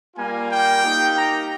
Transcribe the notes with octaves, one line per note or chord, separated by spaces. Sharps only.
G3 A#3 F4 G#5
G5
A#3 D#4 G4
A#5